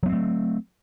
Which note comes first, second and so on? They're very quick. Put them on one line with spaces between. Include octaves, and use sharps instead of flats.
F#3 B3 C4 A3